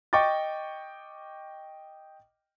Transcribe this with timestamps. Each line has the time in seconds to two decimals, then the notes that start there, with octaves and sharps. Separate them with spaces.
0.13 D#5 G5 C#6 D6 A6